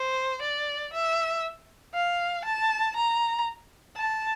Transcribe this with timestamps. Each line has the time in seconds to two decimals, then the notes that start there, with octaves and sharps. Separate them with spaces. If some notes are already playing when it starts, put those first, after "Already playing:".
Already playing: C5
0.42 D5
0.93 E5
1.94 F5
2.45 A5
2.96 A#5
3.97 A5